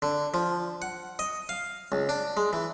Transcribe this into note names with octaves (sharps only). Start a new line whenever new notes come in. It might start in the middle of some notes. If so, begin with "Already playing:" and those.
D3
F3
F#5
D#5
F5
C#2
D4
G#3
E3